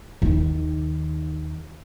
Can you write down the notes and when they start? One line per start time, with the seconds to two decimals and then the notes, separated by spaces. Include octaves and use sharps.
0.22 D#2 D#3